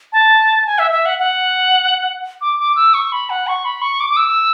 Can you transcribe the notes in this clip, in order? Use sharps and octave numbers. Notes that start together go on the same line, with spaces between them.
A5
G#5
E5
E5
F#5
F#5
D6
D6
E6
C#6
B5
F#5
C#6
B5
C#6
D6
D6
E6